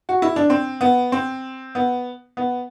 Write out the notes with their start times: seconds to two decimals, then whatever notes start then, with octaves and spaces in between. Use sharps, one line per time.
0.09 F#4
0.22 E4
0.36 D4
0.50 C4
0.81 B3
1.12 C4
1.75 B3
2.37 B3